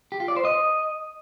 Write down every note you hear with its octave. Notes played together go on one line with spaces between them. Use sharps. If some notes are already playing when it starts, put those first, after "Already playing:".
G4
F4
D5
C5
D#5